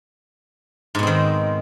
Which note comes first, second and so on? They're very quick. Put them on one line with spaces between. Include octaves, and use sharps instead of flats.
G#2 B2 C4 D#3